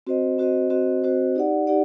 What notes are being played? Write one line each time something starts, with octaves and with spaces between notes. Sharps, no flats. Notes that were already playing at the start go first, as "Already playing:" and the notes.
C4 F#4 C5 D#5
C4 F#4 C5 D#5
C4 F#4 C5 D#5
C4 F#4 C5 D#5
D#4 G4 D5 F#5
D#4 G4 D5 F#5